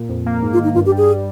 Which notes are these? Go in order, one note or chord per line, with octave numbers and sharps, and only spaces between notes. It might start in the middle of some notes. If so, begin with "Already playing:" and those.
Already playing: A#2
F2
A#3
G#2
F4
D#3
D#4
G2 F4
G4
G3
G#4